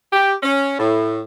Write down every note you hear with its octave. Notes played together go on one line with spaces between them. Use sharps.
G4
C#4
A2